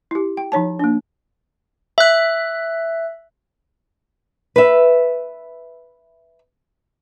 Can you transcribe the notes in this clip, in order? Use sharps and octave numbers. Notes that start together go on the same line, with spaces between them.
E4 G4
G5
F3 D#4 C#5 A5
A#3 D4
E5 F#6
B4 E5